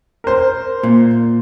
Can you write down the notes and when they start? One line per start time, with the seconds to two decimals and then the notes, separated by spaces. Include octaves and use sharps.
0.24 A#4 C5
0.83 A#2